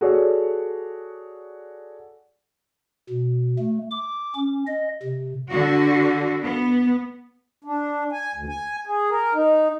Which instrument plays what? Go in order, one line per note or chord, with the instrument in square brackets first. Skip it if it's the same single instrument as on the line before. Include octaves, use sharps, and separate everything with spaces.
[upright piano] F#4 G#4 A4 C#5 D5
[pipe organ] B2
A3
D6
C#4
D#5
C3
[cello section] D3 F#4
B3
[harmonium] D4
G#5
D2
G#5
G#4
A#4
D#4